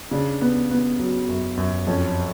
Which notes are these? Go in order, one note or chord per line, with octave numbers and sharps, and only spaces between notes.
C#3 D4
B3
B3
F#3
F#2
F#2
F2 C#4